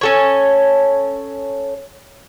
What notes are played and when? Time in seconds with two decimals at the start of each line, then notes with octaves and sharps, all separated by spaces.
0.01 C#4 A4 C#5